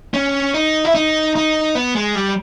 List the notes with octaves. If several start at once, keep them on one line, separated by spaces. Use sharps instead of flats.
C#4
D#4
E4
D#4
D#4
B3
G#3
G3